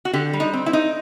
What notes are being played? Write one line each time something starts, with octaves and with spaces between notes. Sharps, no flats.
F#4
D3 G4
G3
D#4
C4
E4
D#4